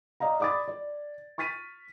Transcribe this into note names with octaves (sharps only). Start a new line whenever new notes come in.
D5 D#5 F5 A#5
D5 B5 D6 D#6 A6
D5
C#6 F6 A6 B6 D#7